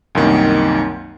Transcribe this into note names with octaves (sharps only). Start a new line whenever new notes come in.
C2 F#2 D#3 A#3